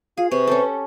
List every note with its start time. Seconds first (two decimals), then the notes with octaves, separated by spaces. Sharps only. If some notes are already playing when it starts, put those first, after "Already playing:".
0.17 F4 G#4 F5
0.31 C3 B4 C#6
0.47 C#4 G4 A4